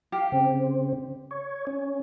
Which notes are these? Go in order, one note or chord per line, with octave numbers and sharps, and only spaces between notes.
G4 F5
C#3 C4
C#5
C#4